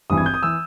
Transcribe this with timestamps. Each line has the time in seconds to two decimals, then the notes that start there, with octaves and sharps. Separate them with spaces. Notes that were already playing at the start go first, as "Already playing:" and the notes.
0.10 G#1 G2 E3 D#6
0.18 G#6
0.26 G6
0.34 D#6
0.43 E3 E6